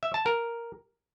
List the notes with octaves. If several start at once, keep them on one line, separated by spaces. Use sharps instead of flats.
E5
A5
A#4